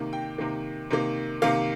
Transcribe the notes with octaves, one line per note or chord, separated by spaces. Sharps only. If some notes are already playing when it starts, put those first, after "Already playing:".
Already playing: C3 D#3 A#3
G5
C3 D#3 A#3
C3 D#3 A#3
C3 D#3 A#3 F5